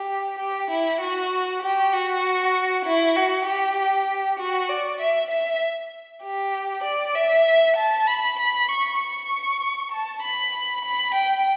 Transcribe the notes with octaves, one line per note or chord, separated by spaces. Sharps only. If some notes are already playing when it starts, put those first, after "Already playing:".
Already playing: G4
G4
E4
F#4
G4
F#4
E4
F#4
G4
F#4
D5
E5
E5
G4
D5
E5
A5
B5
B5
C#6
C#6
A5
B5
B5
G5